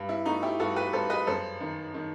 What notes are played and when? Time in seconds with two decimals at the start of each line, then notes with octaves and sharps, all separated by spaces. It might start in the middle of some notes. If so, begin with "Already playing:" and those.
Already playing: G2
0.09 E4
0.26 A3 D#4 F#4
0.43 E4 G4
0.60 G2 F#4 A4
0.76 G4 B4
0.93 G2 A4 C5
1.10 B4 D#5
1.27 F#2 A4 C5
1.60 D#3
1.94 D#3